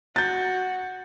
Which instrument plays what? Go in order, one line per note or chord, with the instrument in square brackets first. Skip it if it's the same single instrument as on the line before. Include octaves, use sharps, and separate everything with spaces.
[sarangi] F#4 [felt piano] G6 A6